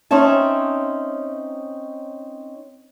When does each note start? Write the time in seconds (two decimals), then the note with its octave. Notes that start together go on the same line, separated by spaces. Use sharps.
0.11 C4 C#4 D#4 C#5 E5 A5